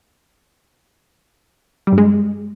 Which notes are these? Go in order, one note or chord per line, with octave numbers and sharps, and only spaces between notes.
G3
G2
G#3